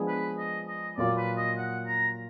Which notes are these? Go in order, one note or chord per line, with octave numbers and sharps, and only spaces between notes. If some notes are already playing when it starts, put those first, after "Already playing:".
Already playing: F3 G#3 B3 D4 G#4
B4
D#5
D#5
A#2 F#3 A#3 F4 D5
B4
D#5
F#5
A#5